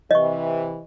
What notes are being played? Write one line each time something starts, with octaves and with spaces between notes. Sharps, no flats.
C3 E3 D#5 C#6